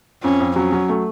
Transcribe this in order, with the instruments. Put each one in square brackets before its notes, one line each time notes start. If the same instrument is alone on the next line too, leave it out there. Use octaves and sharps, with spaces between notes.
[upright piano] F2 [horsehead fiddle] C#4
[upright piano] F2
[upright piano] F#3 [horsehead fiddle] C#4
[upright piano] F#3
A3